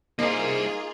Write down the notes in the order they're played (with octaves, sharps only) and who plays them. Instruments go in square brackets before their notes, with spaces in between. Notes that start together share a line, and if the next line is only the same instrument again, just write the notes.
[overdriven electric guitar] G3 C5 [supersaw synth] A#3 [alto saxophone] D#4 [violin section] F4 G#4